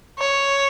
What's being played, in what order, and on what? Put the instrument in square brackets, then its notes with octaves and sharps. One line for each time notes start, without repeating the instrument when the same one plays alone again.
[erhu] C#5